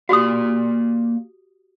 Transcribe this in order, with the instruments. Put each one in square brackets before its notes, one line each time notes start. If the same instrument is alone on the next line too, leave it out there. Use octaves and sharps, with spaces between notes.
[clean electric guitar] A#3 D5 F5 [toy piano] F#4 G4 D#6